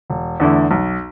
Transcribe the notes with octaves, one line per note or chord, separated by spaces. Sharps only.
E1
E2 D3 A3 E4
B1